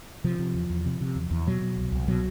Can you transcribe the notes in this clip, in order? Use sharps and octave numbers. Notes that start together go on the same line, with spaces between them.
C3 F3
C3
E2
E2
C3
C3
E2
E2
B2 F#3
B2
C2
C2
B2 F#3